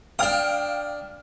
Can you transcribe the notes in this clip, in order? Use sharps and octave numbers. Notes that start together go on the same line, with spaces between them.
D4 F5 G5 D#6 F6